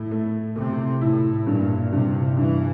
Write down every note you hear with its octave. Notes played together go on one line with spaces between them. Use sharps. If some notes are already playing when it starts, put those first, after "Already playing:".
Already playing: A2 E4
A3
C3 A3
A2 E4
G2 A#2
G2 C3
G2 E3